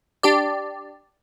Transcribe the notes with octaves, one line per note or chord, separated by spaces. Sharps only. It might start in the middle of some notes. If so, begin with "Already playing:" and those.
D4 G4 D5